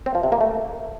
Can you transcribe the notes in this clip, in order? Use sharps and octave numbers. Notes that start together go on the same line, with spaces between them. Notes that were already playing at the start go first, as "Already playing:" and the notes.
C4
F3
C3
A#3
A3